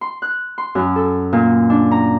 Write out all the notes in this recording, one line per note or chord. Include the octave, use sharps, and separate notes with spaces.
C6
F#6
C6
F#2
A4
A#2
D4
A#5